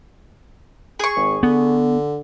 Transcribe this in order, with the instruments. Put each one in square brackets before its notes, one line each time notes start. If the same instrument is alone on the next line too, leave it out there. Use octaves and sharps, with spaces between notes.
[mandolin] G#4 C#6
[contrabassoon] G#1
[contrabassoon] D3 [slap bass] B3